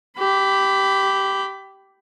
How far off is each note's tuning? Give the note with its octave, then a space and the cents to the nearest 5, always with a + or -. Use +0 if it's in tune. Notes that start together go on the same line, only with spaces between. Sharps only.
G4 -10 B5 +15